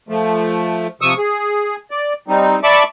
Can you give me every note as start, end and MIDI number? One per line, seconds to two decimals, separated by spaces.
0.09 0.87 53
0.09 0.87 57
1.01 1.14 48
1.01 1.14 53
1.01 1.14 85
1.01 1.14 87
1.01 1.14 88
1.18 1.76 68
1.91 2.13 74
2.28 2.59 55
2.28 2.59 60
2.28 2.59 63
2.64 2.83 74
2.64 2.83 76
2.64 2.83 81
2.64 2.83 83
2.64 2.83 85
2.64 2.83 86